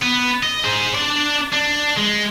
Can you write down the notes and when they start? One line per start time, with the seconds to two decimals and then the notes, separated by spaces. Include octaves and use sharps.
0.02 B3
0.43 D#5
0.64 G#4 C5
0.94 D4 D5
1.52 D4
1.97 G#3